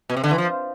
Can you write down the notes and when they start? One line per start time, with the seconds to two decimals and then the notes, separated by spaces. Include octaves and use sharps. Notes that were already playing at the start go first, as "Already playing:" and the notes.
0.10 B2
0.17 C3
0.24 D3
0.31 E3
0.38 F3